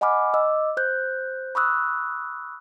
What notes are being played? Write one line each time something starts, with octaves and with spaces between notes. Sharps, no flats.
D#5 F#5 G#5 B5 D6 F6
D#5 D6 E6
C5 F#6 G6
B5 C#6 D#6 E6 F#6